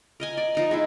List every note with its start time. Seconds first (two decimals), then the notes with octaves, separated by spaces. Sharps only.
0.20 A#4 D#5 G#5
0.37 D5 G#5
0.55 F3 D#4 A#5
0.71 G#3 D#4 E4